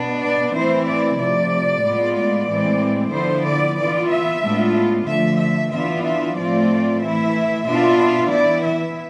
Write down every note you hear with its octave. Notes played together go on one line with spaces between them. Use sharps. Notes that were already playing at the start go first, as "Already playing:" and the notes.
Already playing: B2 B3 D4
D5
E3 A3 C4 E4 C5
D5
C3 F3 A3 D5
A2 G#3 B3 F4
D5
A2 E3 G#3 C4
D3 F3 B3 E4 C5
D5
E3 B3 F4 D5
E5
A2 G#3 B3 D4 F4
D3 F3 A3 E5
E5
E3 B3 D4 F4 E5
E5
A2 F3 A3 C4 F4 D5
E3 A3 E4 E5
B2 B3 D4 F4 E5
E5
E3 B3 E4 D5
E5